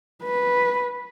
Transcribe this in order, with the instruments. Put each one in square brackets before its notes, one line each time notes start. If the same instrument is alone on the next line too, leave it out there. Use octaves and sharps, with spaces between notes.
[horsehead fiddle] B4